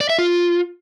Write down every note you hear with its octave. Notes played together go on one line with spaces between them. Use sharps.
D5
E5
F4